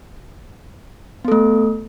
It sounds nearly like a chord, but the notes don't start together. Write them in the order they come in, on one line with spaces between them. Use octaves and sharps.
B3 A4 A3